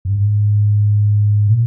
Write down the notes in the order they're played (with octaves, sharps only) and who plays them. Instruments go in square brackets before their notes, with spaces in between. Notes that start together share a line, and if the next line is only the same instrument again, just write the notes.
[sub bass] G2
G#2
A#2